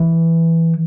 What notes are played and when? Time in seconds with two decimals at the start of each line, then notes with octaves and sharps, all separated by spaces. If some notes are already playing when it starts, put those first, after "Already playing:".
Already playing: E3